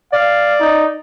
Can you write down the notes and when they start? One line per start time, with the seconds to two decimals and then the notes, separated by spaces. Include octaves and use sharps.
0.13 D5 F5
0.60 D#4